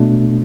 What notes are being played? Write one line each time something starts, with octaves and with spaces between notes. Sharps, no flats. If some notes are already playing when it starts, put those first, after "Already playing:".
Already playing: B2 A3 D4